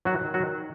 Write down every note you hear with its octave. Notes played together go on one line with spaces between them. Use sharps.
D#3 F#3 F#4
D#3
F#3 F#4
D#3